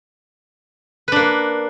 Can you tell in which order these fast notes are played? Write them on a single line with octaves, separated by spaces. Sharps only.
B4 D4 A#3